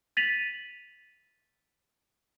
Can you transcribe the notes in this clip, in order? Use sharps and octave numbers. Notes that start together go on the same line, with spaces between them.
A6 B6 D#7 F7 F#7